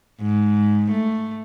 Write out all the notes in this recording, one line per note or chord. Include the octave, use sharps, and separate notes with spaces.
G#2
A3